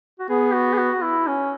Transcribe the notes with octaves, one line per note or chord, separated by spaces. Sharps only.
F#4
B3 G#4
F#4
G#4
F#4
E4
C#4